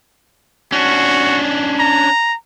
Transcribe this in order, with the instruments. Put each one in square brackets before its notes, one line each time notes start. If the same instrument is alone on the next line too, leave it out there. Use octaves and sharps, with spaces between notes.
[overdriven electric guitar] C#4 D4 [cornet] F#4
[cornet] A#5